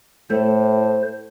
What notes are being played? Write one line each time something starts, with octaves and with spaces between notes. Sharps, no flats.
A2 A3 C5